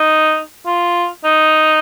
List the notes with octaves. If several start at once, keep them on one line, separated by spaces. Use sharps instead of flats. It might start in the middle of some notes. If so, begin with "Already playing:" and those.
Already playing: D#4
F4
D#4